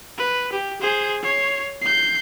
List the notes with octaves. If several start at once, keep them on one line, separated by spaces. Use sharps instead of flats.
B4
G4
G#4 C5
C#5 C7
G6 C7